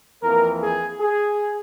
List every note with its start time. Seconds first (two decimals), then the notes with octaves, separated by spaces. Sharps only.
0.21 F2 E3 A#3 A#4
0.61 G#4
1.01 G#4